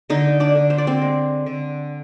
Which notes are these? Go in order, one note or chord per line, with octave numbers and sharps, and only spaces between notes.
D3 D#4 D#5
D4 D5
D3
C5
D5
C4 C5
G#3
D3